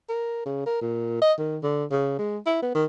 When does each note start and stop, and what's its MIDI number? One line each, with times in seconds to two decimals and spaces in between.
0.09 0.43 70
0.46 0.65 49
0.66 0.81 70
0.81 1.19 46
1.22 1.33 75
1.39 1.58 51
1.63 1.85 50
1.91 2.16 49
2.19 2.38 56
2.46 2.61 64
2.63 2.74 59
2.75 2.85 51